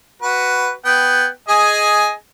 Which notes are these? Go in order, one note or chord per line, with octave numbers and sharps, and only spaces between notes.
F#4 B4
B3 G5
G#4 D#5 G#5